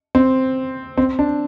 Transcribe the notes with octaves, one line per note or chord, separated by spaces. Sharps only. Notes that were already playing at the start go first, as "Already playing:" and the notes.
C4
C4
D4